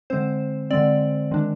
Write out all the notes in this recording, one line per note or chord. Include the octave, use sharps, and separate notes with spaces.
D3 G#3 C4 C5
D3 G#3 C4 D5
D#3 G#3 D4